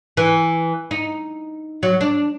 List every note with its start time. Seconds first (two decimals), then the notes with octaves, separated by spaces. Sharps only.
0.17 E3
0.91 D#4
1.83 F#3
2.01 D4